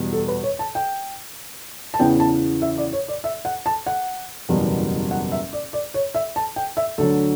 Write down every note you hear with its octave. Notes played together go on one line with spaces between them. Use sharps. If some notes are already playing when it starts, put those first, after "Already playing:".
Already playing: E2 B2 G3
A4
B4
C#5
A5
G5
A5
E2 C#3 E3 B3 G5
A5
E5
D5
C#5
D5
E5
F#5
A5
F#5
F#1 E2 B2 G3 B3
F#5
E5
D5
D5
C#5
E5
A5
G5
E5
D2 D3 F#3 A4